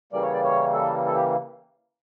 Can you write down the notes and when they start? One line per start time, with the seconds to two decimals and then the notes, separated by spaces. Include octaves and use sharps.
0.12 C#3 E3 G3 A#3 D5
0.22 C#5
0.33 D5
0.44 C#5
0.74 A4
1.06 A4
1.15 G4